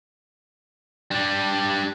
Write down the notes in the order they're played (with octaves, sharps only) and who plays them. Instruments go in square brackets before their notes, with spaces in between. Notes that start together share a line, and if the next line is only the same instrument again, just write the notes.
[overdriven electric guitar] G3 D4